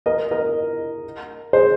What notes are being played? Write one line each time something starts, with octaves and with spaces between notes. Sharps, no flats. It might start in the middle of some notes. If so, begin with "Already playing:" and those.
A#4 D#5
A#4 D#5
G#4 C5